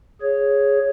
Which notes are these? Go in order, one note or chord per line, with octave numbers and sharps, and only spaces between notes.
G#4 C#5